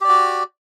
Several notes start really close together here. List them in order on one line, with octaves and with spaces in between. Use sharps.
G4 D5 F#4